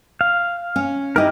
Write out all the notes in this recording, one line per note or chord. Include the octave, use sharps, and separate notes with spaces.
F5
C#4
D#4 E4 G4 A#4 D#5